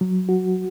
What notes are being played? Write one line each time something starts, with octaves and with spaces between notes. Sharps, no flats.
F#3
F#4